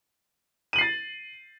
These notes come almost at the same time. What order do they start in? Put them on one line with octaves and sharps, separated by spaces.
D#7 F#7 C7 A6